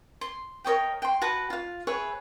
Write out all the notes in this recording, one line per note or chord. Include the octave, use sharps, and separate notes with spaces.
C6
A#4 C#5 D#5 G5
G5 C6
F#4 B4 F#5 A5
F4 F5
G#4 B4 C#5 E5